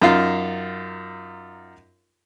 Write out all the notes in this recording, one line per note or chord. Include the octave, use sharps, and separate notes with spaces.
F#2 D#4 F4 F5